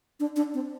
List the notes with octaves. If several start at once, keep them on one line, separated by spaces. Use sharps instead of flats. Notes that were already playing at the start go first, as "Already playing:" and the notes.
D4
D4
C4